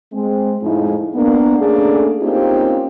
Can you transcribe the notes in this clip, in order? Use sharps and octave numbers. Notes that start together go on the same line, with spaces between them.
G#3 C4
F2 A2 F3 G#3 D#4 E4
A#3 B3 D4
A3 A#3 C#4 D4 G#4 A4
A#3 C4 C#4 D#4 F4 G4